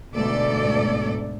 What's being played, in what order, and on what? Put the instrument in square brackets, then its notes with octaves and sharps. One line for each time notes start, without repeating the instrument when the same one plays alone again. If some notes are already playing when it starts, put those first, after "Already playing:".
[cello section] D2 G#2 B2 A3 A4 D5